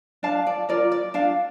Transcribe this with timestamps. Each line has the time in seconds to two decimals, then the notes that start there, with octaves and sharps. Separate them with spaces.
0.23 D4 F5 A5
0.47 D5
0.69 F4 A#4 D5
0.92 D5
1.14 D4 F5 A5